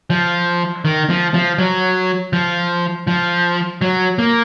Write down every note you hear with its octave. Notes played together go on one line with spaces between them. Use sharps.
F3
D#3
F3
F3
F#3
F3
F3
F#3
A#3